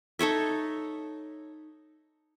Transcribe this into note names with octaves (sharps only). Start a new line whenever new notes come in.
D#4 A4 C#5 E5